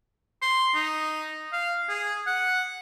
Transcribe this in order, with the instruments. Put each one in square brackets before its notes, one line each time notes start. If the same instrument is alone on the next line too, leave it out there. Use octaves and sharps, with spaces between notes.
[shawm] C6
D#4
F5
G#4
F#5